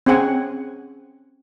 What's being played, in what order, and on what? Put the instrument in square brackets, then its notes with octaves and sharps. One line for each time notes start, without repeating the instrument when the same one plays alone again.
[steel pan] C4 C#4 G#4 F#5 G#5